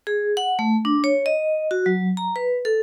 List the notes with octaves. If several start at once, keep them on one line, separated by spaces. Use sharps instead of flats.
G#4
F#5
A3
D4
C#5
D#5
F#4
F#3
A#5
B4
A4